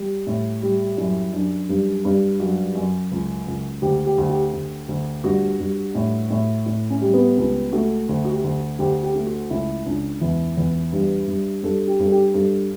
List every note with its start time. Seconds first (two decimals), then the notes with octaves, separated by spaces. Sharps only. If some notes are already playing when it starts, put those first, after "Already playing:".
Already playing: G3
0.27 A2
0.62 G3
0.98 F#2 E4
1.33 F#2 D4
1.69 G2
2.05 G2
2.40 F#2 F#4
2.75 F#2
3.11 C#2
3.47 C#2
3.82 D2 G4
4.06 G4
4.18 D2
4.30 G4
4.53 D2
4.89 D2
5.24 G2 F#4
5.59 G2
5.95 A2
6.30 A2
6.66 A2 E4
6.90 C#4
7.01 G3
7.14 B3
7.37 C#2 B3
7.73 A3 F#4
8.09 D2
8.25 F#4
8.32 G4
8.44 D2
8.79 D2 G4
9.03 G4
9.15 A3
9.27 F#4
9.50 C#2 E4
9.86 C#2 D4
10.21 E2 E4
10.57 E2
10.93 G2
11.28 G2
11.63 G2 A4
11.87 G4
11.99 G2
12.05 A4
12.11 G4
12.34 G2 A4